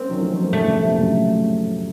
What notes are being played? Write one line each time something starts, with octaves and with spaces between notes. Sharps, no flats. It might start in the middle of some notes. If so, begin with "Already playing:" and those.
Already playing: A#3 C4 C#4
D#3 F#3
F3 A3
F#3 A#3
A3 C4
C3 D#3 A3
C#3 F3
A#2 C#3
A2 C3
F#2 A#2